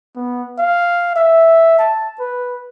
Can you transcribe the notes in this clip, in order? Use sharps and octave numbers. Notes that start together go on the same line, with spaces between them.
B3
F5
E5
A5
B4